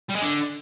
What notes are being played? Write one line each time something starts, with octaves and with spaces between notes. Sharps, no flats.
G3
G#3
D3